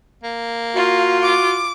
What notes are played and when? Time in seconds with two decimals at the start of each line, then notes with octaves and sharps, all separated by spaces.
0.24 A#3
0.75 F4 F#4
1.22 D6